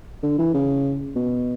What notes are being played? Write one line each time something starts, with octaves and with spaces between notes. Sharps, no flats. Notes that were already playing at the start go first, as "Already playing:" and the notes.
D3
E3
C#3
B2